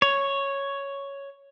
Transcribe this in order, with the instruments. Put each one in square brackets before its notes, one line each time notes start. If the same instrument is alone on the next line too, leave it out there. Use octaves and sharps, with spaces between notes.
[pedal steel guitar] C#5